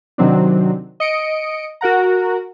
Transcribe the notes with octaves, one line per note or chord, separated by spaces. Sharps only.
C3 D#3 F#3 C4 D4
D#5 C#7 D7
F#4 A#4 F#5 A#5